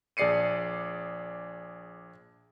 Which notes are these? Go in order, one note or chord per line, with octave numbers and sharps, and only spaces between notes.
A#1 G#4 D5 C7 C#7 D#7